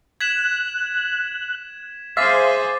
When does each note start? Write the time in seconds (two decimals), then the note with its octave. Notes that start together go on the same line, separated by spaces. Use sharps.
0.21 F#6 G#6 B6 E7
2.17 G#4 C5 E5 F5 C6 D6 A6 B6